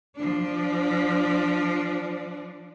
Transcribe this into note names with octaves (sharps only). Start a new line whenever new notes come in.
F3 D4